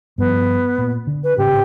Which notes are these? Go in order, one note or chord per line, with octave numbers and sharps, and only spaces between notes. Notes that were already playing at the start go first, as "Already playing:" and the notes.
G2 F3 B3
A#2
D3
B4
G#1 A2 C#3 G4